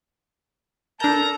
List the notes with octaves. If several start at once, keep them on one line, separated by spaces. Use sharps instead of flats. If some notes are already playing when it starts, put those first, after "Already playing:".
D4 A4 A#4 A5 A#5 G6